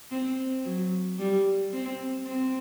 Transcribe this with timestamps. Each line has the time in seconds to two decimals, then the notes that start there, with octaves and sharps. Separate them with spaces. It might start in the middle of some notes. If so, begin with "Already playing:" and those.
0.11 C4
0.65 F#3
1.19 G3
1.73 C4
2.26 C4